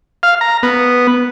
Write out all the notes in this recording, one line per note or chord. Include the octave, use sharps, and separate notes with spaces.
F5
A#5
B3